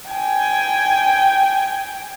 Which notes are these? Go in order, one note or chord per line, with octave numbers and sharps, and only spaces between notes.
G5 G#5